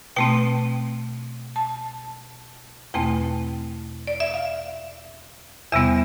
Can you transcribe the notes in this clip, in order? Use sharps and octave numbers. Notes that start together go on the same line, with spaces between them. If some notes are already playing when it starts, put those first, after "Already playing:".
B2 A3 C4 G5
A5
E2 B2 A3 C4 G5
D5
E5
F5
E2 C3 G3 B3 E5